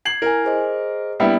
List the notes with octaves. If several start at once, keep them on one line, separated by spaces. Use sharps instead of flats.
G#6 C7 F#7
E4 A#4 G#5
G#4 C5 D#5
G3 A#3 B3 D4 E4